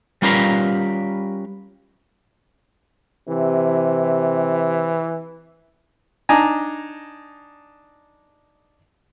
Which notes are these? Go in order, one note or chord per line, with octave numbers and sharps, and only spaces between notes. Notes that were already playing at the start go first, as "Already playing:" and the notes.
G3 C#4 F4 A#4 B4 F5
C3 E3
D4 D#4 G#5 A#5